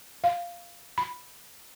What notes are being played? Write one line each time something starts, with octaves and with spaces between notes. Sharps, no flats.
F5
B5